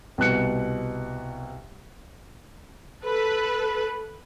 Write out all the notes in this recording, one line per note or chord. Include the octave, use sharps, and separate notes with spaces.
C2 B2 F#6 C#7
A4 B4